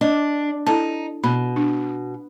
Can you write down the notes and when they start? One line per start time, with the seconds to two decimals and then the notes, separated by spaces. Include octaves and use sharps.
0.01 D4 D#5
0.67 D#4 E4 A4 A5
1.24 B2 B5
1.56 D4